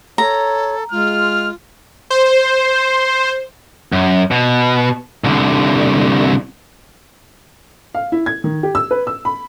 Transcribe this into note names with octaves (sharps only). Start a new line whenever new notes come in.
A4 C#5 A#5
G#3 F4 F6
C5
F#2
B2
C2 D3
F5
E4
G#6
D#3
G4
E6
B4
E6
B5